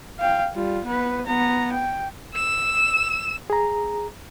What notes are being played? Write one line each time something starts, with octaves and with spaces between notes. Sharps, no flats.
F5 G5
G3 F4
B3 B4
B3 A#5
G5
E6 E7
G#4 A#5